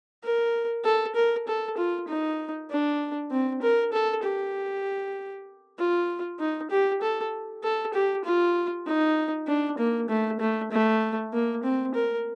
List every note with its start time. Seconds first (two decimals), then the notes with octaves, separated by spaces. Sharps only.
0.24 A#4
0.85 A4
1.15 A#4
1.47 A4
1.77 F4
2.08 D#4
2.71 D4
3.31 C4
3.62 A#4
3.93 A4
4.23 G4
5.78 F4
6.39 D#4
6.71 G4
7.02 A4
7.64 A4
7.94 G4
8.25 F4
8.87 D#4
9.48 D4
9.78 A#3
10.09 A3
10.40 A3
10.72 A3
11.33 A#3
11.64 C4
11.95 A#4